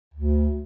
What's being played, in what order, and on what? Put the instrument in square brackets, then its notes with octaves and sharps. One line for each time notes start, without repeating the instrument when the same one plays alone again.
[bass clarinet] D2